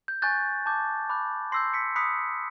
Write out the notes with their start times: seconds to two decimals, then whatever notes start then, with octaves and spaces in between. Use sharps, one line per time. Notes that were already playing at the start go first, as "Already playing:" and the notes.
0.08 G6
0.22 G#5 C#6 F#6 G6 A6
0.66 A5 D6 G6
1.09 B5 D6 F#6
1.52 C6 E6 G6 A#6 C7
1.74 B6 C#7
1.96 B5 D#6 F#6 B6 C#7